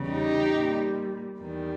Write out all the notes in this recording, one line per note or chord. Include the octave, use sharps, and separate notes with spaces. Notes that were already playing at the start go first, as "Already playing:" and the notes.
Already playing: E2 C#3 G3
D#4 G4
A#2 G3
E2 D#3 G3